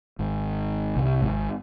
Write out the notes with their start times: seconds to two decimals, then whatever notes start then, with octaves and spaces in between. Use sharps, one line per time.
0.19 G#1 G#2
0.96 C2 C3
1.21 G#1 G#2